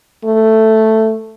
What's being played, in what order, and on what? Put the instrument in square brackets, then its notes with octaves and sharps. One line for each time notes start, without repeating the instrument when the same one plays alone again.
[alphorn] A3